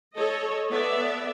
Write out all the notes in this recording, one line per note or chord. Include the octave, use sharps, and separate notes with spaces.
A4 C#5 D#5
B3 A4 D5 E5